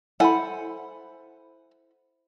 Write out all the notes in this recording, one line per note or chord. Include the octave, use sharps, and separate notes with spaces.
E4 A4 C5 F#5 G#5 B5